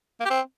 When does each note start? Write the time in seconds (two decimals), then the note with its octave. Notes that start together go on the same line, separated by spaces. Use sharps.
0.20 A#3
0.25 G4
0.30 C4